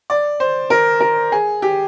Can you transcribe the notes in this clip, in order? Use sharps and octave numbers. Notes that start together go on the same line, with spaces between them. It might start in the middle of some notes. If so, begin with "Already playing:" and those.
D5
C5
A#4
A#4
G#4
G4